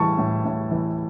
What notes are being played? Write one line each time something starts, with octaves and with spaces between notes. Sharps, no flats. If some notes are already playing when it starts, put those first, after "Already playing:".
Already playing: A2 E3 G3 A5 C#6
A2
A2
E3